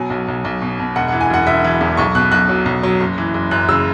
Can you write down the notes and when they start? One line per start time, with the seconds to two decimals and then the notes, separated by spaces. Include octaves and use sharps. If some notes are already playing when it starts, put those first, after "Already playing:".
Already playing: B2 F#3 G#5
0.10 B1
0.28 B1
0.45 B1
0.62 B2
0.79 B2
0.96 E1 F#5
1.08 E3 F#5
1.21 G#5
1.30 E1 F#5
1.47 E1 E5
1.64 E3
1.81 E2
1.97 B1 C#6
2.15 B2 F#6
2.32 B1 F#6
2.49 F#3
2.66 B1
2.83 F#3
3.00 F#1
3.18 E3
3.34 F#1
3.51 F#2 F#6
3.68 C#3 E6